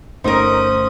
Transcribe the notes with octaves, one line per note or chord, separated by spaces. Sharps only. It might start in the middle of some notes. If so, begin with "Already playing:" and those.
G1 A3 C#4 D#4 A#4 C5 D#6